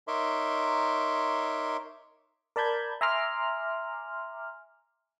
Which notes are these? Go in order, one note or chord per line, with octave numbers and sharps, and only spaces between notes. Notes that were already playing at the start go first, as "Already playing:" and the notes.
D#4 A#4 C#5 E5 C6 D6
A#4 D5 A5 B5 G6 G#6
E5 G#5 A#5 C6 D6 F6